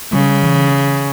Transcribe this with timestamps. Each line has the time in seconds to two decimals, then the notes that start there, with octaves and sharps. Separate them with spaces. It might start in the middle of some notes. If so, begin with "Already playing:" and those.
0.13 C#3 G3
0.43 E3